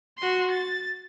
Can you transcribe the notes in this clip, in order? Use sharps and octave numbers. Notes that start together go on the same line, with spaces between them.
F#4 C6
A6